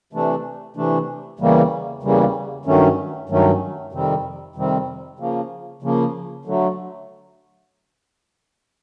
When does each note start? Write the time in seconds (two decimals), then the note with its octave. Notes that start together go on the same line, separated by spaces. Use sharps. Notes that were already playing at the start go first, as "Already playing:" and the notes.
0.13 C3 E3 A3 D4
0.76 C3 E3 A3 D4
1.39 E2 C#3 E3 G3 A#3
2.03 E2 C#3 E3 G3 A#3
2.65 G2 D#3 F#3 A3 C#4
3.29 G2 D#3 F#3 A3 C#4
3.93 F2 C3 D#3 G3 C4
4.56 F2 C3 D#3 G3 C4
5.19 C#3 F3 A#3
5.82 C#3 F3 A#3
6.45 D3 F#3 A3